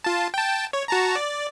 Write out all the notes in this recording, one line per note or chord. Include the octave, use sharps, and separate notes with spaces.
F4 A5
G5 A5
C#5
F#4 A5 A#5
D5